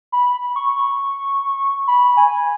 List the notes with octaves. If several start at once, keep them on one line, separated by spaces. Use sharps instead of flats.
B5
C#6
B5
G#5